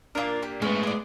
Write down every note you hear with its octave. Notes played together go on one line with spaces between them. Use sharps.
A#2 A#3 D4 F4 A#4
G4
G#2 G#3 A3 B3 C#4
G#4 D5